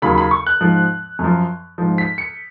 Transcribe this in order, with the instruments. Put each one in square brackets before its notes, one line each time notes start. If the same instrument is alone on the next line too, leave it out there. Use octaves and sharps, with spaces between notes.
[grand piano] D#2 C#3 F#3 B5
B5
C#6
F#6
G#2 F3
F#2 F3
G#2 F3
B6
C#7